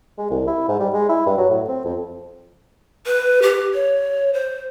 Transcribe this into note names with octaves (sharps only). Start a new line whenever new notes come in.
G#3
C2
E4
G#2
G3
G#3
E4
G2
F#3
A2
C4
F2
B4
G4
C#5
C5